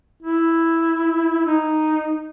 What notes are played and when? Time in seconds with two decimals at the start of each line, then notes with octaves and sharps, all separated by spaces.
0.23 E4
1.46 D#4